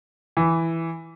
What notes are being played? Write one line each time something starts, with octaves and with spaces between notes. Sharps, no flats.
E3